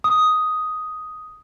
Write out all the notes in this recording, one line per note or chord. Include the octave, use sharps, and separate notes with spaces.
D#6